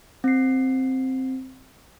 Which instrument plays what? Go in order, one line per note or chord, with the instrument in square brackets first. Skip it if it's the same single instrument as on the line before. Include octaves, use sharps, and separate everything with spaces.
[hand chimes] C4 C7